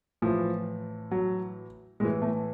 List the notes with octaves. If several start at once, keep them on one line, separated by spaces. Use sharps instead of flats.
A2 E3 F3
F#3
A2 E3 G#3
A3